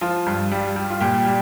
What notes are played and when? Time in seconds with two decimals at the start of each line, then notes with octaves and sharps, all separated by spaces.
0.01 F3 F4
0.26 G2
0.51 G3
0.76 G3
0.90 F4
1.01 A#2 G4
1.26 G3